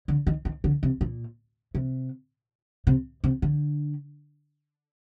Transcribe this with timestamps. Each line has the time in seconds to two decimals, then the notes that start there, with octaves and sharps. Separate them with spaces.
0.08 D3
0.27 D#3
0.45 D#3
0.64 D3
0.83 C3
1.01 A#2
1.75 C3
2.87 C3
3.24 C3
3.42 D3